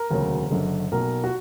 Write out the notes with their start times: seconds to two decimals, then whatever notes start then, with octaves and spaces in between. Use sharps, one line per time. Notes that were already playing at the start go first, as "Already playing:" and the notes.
Already playing: A#4
0.10 E1 D2 C#3 F#3 A#3
0.51 F#1 F#2 D3
0.92 B1 B2 A#3 A#4
1.24 F#4